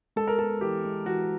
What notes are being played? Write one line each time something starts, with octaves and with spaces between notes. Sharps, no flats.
G#3 A4
A#4
B3 A4
E3 G4
G#3
E3 F#4